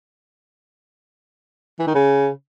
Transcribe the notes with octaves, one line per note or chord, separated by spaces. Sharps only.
E3
D#3
C#3